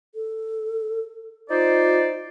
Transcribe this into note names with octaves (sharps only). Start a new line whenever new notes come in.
A4
D#4 F4 C5 D5